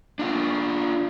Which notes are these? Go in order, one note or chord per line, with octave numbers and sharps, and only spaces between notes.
D4 F4